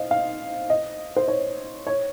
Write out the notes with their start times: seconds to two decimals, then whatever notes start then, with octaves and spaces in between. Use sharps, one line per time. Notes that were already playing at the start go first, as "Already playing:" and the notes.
Already playing: C5 D#5 F5
0.11 F5
0.70 D#5
1.17 C5
1.28 C#5
1.87 C#5